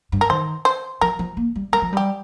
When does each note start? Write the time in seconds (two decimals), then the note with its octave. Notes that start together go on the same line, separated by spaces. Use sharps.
0.12 G2
0.21 A#4
0.30 D#3 C5
0.65 C5
1.01 F3 A#4
1.19 F3
1.37 A#3
1.56 G3
1.73 G3 A#4
1.82 F3
1.93 G3 G4